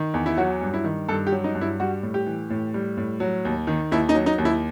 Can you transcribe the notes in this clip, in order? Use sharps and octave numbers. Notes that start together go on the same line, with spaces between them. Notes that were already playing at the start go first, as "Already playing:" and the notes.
Already playing: D#3
E2
E4
F#3 F#4
G2
E4
D#3
G2 A4
G4
F#3
D#4
G2
E4
G3 F#4
A2
G4
E3
A2
G3
A2
F#3
D#2
D#3
D#2 E4
D#4
F#3
D#4
D#2
E4